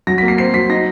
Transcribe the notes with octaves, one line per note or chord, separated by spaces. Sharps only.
F#3 A#6
A#3 B6
C7
C4 C7
F#3 B6
D#4 A#6